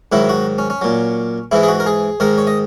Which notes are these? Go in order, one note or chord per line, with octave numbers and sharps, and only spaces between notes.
G#2 D#3 F#3 E4
F#4
C#4
C#4
A#2 F#3
G#2 E3 G#3 E4
G#4
F#4
A#4
G#4
G#2 D#3 G#3 A#4
C#5
D#5